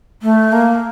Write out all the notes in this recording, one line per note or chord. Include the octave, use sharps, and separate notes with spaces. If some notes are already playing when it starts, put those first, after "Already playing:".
A3
A#3